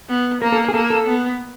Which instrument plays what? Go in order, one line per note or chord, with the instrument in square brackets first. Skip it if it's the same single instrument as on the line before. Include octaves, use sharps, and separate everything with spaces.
[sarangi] B3
[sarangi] A#3 [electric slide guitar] A#4
[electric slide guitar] A4
G#4
[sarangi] A#3 [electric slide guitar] A4
[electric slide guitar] A4
[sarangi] B3